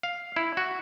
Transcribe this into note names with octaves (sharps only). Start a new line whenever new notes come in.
F5
E4
F#4